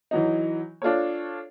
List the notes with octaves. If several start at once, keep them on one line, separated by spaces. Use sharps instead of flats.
E3 F#3 D#4
D4 F4 A4 C#5